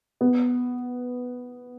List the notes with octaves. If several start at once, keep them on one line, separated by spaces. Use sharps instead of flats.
B3